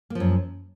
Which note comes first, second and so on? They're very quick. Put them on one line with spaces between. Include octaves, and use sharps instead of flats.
A#3 F3 F#2